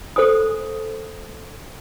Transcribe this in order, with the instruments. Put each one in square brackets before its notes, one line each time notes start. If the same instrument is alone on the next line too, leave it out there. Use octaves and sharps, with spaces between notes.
[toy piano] A4 C5 G#5 D#6